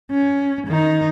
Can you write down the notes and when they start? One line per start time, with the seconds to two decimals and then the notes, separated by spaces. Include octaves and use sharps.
0.11 C#4
0.67 D#3 D#4